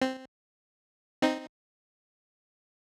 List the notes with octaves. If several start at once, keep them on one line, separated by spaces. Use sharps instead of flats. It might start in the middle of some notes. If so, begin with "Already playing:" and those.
C4
C4 D#4